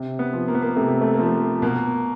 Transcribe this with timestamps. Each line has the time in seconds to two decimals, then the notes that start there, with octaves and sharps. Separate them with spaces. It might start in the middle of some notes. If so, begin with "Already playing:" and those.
Already playing: C3
0.19 B3
0.33 F3
0.48 A#3
0.55 B3
0.62 A#3
0.76 C3 A3
0.89 A#3
1.01 A3
1.14 A#3
1.19 F3
1.27 A3
1.62 B2 A#3